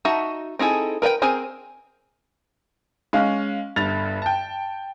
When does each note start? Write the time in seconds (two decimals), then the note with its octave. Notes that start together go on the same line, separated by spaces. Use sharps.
0.05 D#4 F#4 E5 A5
0.59 C4 D#4 E4 G#4 A4
1.02 A#4 B4 E5 G5
1.22 C4 G#4 A#4 C5 G#5
3.13 G#3 C#4 F5
3.76 G1 G2 A6 F7
4.22 G5 A5